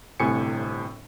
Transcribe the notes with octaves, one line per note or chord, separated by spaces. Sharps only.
G1 A2 C3 G#5 C#7